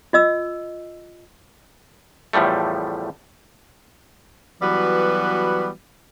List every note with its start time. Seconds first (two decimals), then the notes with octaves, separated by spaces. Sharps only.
0.13 F4 D#5 E6
2.33 E2 A2 F3 G3 A3
4.62 E3 F#3 G3 B3 F#4 B4